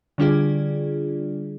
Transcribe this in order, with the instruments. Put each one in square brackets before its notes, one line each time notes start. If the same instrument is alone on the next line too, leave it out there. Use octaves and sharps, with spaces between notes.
[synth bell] D3 G3 D4 F4 G#4 D5